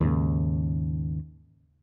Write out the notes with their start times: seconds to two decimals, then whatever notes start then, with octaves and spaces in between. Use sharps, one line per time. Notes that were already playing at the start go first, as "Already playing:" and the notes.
0.01 D#2 G#2 C#3